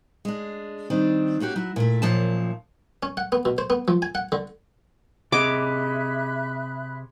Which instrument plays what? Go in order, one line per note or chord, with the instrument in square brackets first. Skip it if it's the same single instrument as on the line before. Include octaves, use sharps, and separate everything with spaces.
[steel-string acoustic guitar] G#3 D4
D#3 G3 C4 D4
A#3 C#4 F#4 G4
F#3 E4
A#2 A3
F#2 A#2 F3 C#5 A5
[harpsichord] C#4
F#5
B3
B2
C5
B3
F3
G#5
F#5
D3
[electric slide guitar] C3 G#4 D#5 [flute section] E5 B5 F#6 [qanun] D6